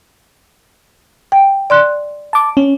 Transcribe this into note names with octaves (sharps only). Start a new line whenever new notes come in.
G5
D5 C6 F#6
A5 D6
C#4